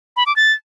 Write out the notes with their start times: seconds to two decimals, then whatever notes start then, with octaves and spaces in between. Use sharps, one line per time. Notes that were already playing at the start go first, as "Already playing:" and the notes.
0.17 B5
0.26 D6
0.36 A6